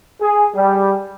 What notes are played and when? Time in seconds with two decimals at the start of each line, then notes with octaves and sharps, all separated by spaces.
0.22 G#4
0.55 G3